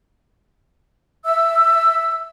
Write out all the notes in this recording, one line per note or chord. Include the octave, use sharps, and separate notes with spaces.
E5 E6